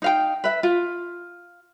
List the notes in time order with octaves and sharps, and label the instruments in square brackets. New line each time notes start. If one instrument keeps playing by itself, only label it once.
[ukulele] D#4 F5 G5
B4 E5
F4